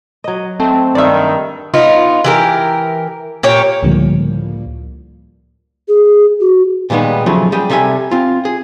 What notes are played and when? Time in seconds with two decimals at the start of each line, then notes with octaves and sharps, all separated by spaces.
0.24 F#3 D#5
0.60 A3 C4
0.95 G2 D#3 D5 E5
1.74 B3 D#4 F4
2.25 E3 G4 A#4
3.43 A#2 G4 C#5
3.83 C#2 A2 D3 F3 G3 A#3
5.88 G#4
6.41 F#4
6.90 A#2 D#3 G3 G#3 B3
7.26 C#3 F3 F#3 A3
7.52 G3 G4 G#4
7.70 C3 G3 A4 E5 F5 G#5
8.11 C4 F4
8.45 G#4